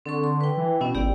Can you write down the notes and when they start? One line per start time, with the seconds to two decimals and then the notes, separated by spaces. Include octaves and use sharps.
0.06 D3 C4 A4 C#6
0.24 C6
0.41 B4 G5
0.57 E3
0.81 B2 B3 C#4 E4
0.95 G#1 G4 D5 G5